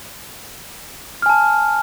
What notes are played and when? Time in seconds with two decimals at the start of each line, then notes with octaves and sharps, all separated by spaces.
1.22 F6
1.26 G#5
1.29 A5